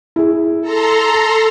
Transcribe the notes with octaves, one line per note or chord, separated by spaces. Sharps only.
E4 G#4
A4 A#5 C6